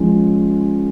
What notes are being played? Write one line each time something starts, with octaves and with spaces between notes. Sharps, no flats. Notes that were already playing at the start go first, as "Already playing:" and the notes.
Already playing: F3 G#3 C#4